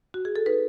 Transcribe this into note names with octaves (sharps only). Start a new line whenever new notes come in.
F#4
G#4
A4
D#4 B4